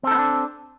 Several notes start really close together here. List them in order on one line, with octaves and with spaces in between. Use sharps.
C4 A4 D#4 B3 D4